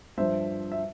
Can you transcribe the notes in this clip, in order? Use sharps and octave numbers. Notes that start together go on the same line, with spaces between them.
G2 F3 C5 E5
E5